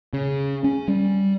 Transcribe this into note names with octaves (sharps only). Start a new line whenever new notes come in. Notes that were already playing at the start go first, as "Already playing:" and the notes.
C#3
C#4
G3